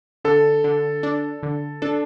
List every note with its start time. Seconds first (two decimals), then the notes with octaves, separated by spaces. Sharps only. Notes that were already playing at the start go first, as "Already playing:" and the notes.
0.24 D3 A4
0.64 D3
1.03 D4
1.43 D3
1.82 D4 A4